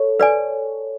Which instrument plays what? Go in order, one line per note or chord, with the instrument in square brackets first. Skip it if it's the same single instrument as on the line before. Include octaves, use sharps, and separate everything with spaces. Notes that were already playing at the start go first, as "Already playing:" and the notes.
Already playing: [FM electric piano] A4 C#5
[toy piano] B4 D5 G#5